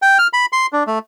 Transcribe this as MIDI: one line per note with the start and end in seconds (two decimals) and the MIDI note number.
0.02 0.18 79
0.19 0.27 89
0.33 0.46 83
0.53 0.66 84
0.73 0.84 62
0.87 0.99 57